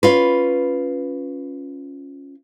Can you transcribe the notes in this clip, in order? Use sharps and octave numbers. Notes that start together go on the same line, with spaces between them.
C#4 F4 B4